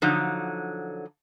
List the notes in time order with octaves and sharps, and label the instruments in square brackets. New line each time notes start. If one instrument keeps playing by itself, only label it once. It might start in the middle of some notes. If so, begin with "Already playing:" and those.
[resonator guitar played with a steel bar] D3 F3 F#3 D#4